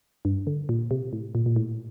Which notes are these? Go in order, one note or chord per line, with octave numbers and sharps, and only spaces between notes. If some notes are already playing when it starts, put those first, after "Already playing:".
G2
D3
A#2
C3
A2
A#2
A#2
A2